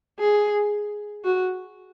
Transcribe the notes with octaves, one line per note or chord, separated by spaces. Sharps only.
G#4
F#4